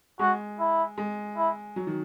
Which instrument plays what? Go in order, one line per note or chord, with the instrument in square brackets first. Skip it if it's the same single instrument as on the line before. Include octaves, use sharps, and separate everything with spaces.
[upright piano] G#3 [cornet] F#4
[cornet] E4
[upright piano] G#3
[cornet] E4
[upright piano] F#3
D#3